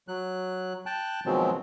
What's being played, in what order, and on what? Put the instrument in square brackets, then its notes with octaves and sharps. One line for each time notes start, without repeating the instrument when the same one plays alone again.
[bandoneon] F#3 F#6
G5 A5 F#6
B2 D#3 F3 F#3 G#3 C4